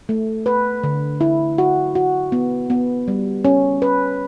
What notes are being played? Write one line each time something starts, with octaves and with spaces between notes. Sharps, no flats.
A3
B4
D3
E4
F#4
F#4
B3
B3
G3
C#4
B4